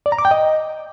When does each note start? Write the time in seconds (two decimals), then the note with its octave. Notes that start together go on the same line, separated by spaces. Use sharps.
0.06 D5
0.12 A#5
0.19 D6
0.25 G5
0.31 D#5